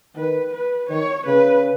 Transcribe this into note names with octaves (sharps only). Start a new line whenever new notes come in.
D#3 B4
B4
D#3 C#5
C#3 B4